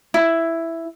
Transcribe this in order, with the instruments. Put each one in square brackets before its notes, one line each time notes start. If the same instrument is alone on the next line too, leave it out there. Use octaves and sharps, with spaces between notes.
[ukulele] E4